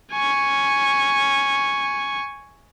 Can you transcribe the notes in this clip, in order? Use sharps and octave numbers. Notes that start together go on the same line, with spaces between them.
G#5 C#6